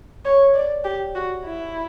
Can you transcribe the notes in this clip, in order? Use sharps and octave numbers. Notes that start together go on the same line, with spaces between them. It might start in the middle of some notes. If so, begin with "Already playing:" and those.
C#5
D5
G4
F#4
E4